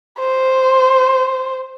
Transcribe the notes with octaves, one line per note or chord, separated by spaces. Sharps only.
C5